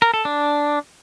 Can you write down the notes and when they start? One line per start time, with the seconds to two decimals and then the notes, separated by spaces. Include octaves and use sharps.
0.02 A#4
0.14 A4
0.25 D4